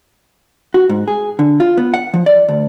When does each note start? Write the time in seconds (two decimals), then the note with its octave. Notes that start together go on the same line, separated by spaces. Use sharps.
0.74 F#4
0.89 G#2
1.08 G#4
1.39 D3
1.60 F4
1.77 B3
1.94 F#5
2.14 F3
2.26 D5
2.49 D2